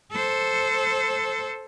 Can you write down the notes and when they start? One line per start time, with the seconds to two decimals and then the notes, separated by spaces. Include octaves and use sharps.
0.12 A4 C5